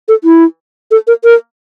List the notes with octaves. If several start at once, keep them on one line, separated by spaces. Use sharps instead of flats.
A4
E4
A4
A#4
A#4